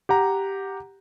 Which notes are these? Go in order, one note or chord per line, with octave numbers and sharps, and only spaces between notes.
G4 F#5 A#5